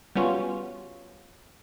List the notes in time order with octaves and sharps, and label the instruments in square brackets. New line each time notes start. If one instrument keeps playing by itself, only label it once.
[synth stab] G3 B3 C#4 F4 F#4